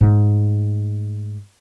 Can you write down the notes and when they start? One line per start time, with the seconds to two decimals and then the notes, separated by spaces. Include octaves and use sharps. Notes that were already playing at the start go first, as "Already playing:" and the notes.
0.01 G#2 A3